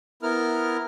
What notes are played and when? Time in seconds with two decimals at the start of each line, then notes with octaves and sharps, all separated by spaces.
0.23 B3 E4 A#4 F6